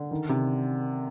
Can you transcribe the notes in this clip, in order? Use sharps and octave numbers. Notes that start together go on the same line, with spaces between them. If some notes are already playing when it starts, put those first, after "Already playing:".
Already playing: D3
D#3
C3